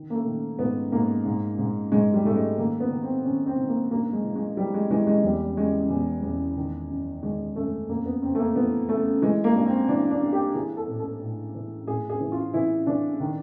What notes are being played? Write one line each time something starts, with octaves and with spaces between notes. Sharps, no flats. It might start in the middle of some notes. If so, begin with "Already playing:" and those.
Already playing: D#3
A#3
A3
D#3
G#2 B3
G#2 A#3
G#2
G#2
G#2 G#3
G3
G#2 A3
G#3
D#3 A#3
B3
D#3
C4
D#3 C#4
C4
D#3
A#3
G2 A#3
G#3
E3
G#3
E3 G3
G#3
E3 G#3
G#3
E2 G3
C#3 G#3
E2
E2
D#3
F#2
D#3 G#3
F#2 A3
F2 A#3
B3
C#3 C4
A3
A#3
E3 B3
C#3 A3
E3 G#3
A#3
G2
C4
E3 D4
D4
G2
G4
E3 G#4
A4
A2
A4
A2
E3
A2 G#4
G#4
E3
F4
E3 E4
E3 D4
D#3